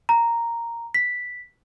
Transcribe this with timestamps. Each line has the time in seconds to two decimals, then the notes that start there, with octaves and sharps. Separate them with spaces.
0.09 A#5
0.94 B6